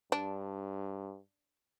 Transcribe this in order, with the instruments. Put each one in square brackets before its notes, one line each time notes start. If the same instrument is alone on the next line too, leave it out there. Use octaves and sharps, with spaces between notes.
[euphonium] G2 [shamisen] D4